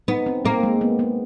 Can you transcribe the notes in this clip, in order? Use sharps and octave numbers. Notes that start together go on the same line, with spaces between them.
B3 D#4
C4
A#3 C4
G#3
B3
B3